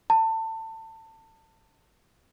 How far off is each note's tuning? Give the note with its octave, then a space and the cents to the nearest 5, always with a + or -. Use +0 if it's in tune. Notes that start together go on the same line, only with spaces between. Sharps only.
A5 +25